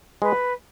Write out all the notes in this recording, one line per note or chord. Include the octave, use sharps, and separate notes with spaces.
G#3 B4